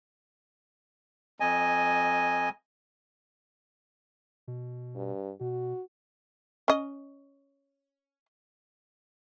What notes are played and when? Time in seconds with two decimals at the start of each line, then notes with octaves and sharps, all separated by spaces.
1.40 F2 D#5 G#5
4.48 B2
4.96 G2
5.41 B2 F#4
6.68 C#4 D#5